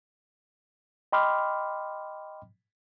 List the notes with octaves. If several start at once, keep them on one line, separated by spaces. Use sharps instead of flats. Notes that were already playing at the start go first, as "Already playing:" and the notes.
D#5 G5 B5 C6 D6 F6